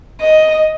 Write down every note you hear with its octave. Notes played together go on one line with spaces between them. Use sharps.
D#5